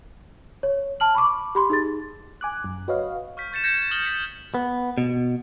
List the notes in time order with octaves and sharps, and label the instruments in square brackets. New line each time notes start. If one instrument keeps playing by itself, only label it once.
[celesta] C#5
A5 F6 F#7
B5 C#6 D6
G4 B5 C6
D#4 G#4 A6
[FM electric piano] G#5 D6 F#6
F#2
F#4 B4 C#5 D#5 F5
[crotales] C#6 F6 G6 B6
C#6 G6 A6 C#7 E7
G6 G#6 A#6 B6 C#7 E7
D#6 F6 G#6 F#7 G7
A6 B6 C#7 E7
[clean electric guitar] B3
B2